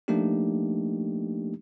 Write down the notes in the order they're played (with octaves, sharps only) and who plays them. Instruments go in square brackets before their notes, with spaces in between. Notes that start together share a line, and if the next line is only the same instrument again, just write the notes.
[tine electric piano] F3 A3 A#3 D4 D#4 G4